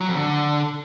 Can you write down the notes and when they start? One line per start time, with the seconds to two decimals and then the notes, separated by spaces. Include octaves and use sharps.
0.01 F#3
0.08 F2
0.15 D3